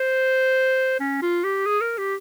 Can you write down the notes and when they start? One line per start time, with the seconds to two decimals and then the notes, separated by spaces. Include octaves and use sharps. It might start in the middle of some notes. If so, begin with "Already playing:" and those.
Already playing: C5
1.00 C#4
1.22 F4
1.44 G4
1.66 G#4
1.81 A#4
1.98 G4